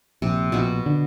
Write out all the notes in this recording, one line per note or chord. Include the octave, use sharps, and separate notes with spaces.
A#1 C3
A#1 B2 F#4
D3